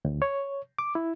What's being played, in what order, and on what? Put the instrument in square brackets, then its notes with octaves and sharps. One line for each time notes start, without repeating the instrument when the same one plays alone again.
[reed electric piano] D2
C#5
D6
E4